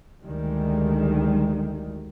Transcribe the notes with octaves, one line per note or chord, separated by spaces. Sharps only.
D2 D#3 G3 G#3